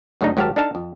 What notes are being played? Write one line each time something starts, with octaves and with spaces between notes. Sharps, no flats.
F#2 C#3 A3 D4 D#4
G#1 F#3 G4 A#4 F5 A5
D4 D#4 A4 F5 A5
F2